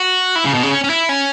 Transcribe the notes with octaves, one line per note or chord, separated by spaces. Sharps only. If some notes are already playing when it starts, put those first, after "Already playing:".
Already playing: F#4
E4
C#3
B2
C#3
C#4
C#4
E4
C#4